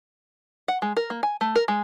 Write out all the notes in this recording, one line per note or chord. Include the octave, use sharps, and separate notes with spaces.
F#5
G#3
A#4
A#3
G#5
A3
A#4
G#3